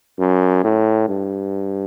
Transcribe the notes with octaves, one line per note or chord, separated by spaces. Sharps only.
F#2
A2
G2